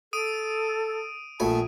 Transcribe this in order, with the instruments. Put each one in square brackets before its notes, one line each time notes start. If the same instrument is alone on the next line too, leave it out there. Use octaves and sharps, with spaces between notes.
[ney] A4 [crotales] D#6 D7 D#7
[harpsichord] A#1 A3 G#5 [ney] A5